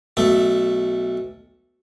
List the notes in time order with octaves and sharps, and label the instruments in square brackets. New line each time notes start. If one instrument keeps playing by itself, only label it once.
[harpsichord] B1 A3